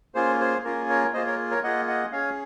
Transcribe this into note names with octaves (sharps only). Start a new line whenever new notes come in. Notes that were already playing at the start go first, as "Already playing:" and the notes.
A#3 C#4 F4 G#4 C5
G#4 C5
A#3 C#4 F4 G#4 A#4
A#4 C#5
A#3 F4 G#4 C5 D#5
A#4 C#5
A#4 C#5
A#3 F4 G#4 D#5 F#5
D#5 F#5
C#4 G#4 C#5 F5